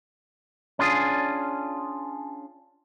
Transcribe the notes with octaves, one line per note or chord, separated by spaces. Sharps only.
C#4 D4 F4 G#4